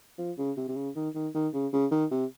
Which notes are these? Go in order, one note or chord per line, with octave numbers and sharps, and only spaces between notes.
F3
C#3
C3
C3
C#3
D#3
D#3
D#3
C#3
C#3
D#3
C3